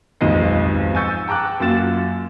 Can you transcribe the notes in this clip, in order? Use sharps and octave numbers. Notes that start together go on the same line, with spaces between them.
D#1 B1 F2 G#2 D#5 C7
G#5 C#6 E6 G6 A6 C#7
G5 A5 A#5 D6 F#6
F#2 A#3 F4 F#4 A6 E7